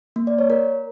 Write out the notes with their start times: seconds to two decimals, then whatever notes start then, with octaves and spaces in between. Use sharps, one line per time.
0.16 A#3
0.27 D5
0.38 C#5
0.50 A#4